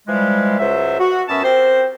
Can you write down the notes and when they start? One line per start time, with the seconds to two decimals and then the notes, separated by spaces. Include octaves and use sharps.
0.08 E3 F3 G3 G#3
0.59 C#2 F#3 C5 E5
1.00 F#4
1.29 F#2 B3 C#4 F#4 E5 A5
1.44 C4 G4 A#4 C5